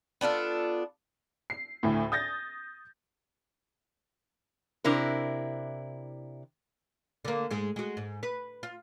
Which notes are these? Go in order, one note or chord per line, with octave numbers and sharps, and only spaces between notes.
B3 D4 F4 A4
C7
D2 A2
D#6 G6 A6 A#6
C3 D4 E4 A#4
D3 A#3
G#2 G#3
G#3 F#4
G#2
B4
F4